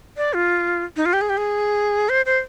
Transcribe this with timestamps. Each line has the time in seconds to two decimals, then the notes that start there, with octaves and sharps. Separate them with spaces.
0.17 D5
0.33 F4
0.96 D#4
1.06 F4
1.13 G4
1.21 G#4
1.30 G4
1.37 G#4
2.09 C5
2.26 C5